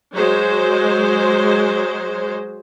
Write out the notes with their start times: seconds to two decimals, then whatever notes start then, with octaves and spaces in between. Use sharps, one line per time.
0.13 F#3 G#3 C5